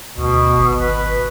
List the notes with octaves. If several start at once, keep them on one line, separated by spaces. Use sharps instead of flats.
D2 B2
G#1
B4